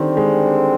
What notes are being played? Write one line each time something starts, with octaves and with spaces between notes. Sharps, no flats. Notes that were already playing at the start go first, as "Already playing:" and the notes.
Already playing: D3 D#3 G3 C4
G#3